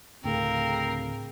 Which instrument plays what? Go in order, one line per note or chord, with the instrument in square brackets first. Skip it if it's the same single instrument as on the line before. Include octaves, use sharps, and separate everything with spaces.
[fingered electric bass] D2 A2 A3 [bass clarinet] C#3 [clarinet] C4 [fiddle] A#4